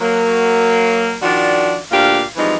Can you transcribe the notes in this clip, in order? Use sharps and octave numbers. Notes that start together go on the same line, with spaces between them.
F#3 A#3
D#3 F3 D4 F#4 D5
D2 A#2 D4 G4 F5
E3 F3 G3 G#3 C4 D#4